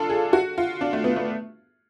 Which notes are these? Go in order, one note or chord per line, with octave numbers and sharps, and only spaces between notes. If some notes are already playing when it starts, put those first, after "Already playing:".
Already playing: D4 F4 A4
G#4
F#4
F4
D4
A3
B3
A3